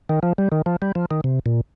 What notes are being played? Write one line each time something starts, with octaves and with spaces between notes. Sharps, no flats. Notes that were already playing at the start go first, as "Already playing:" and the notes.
D#3
F3
G3
D#3
F3
G3
F3
D#3
C3
A#2